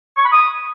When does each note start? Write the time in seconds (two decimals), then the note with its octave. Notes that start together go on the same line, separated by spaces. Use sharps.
0.17 C#6
0.25 B5
0.32 D#6